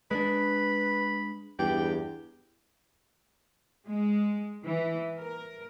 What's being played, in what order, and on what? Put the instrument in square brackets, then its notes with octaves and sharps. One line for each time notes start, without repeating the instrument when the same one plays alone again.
[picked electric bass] G#3 A#3 D4 [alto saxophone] B4 [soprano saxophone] B5
[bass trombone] E2 [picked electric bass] G2 [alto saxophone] G4 [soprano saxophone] G5
[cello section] G#3
E3
A#4